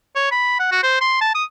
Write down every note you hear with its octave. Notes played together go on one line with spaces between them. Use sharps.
C#5
B5
F#5
F#4
C5
C6
A5
D#6